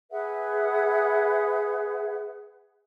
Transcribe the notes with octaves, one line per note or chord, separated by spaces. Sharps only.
G#4 B4 E5 F#5